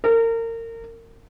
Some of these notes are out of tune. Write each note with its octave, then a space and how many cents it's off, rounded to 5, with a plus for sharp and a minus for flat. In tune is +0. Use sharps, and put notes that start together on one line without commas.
A#4 -30